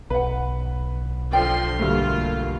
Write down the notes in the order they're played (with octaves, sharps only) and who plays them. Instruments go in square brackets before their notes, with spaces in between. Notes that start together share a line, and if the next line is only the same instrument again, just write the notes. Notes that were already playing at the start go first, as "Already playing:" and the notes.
[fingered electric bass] B1 [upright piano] B4 F#5
[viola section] D3 F3 C6 [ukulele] D5 G5
[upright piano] D2 G2 A3 [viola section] A#3 F4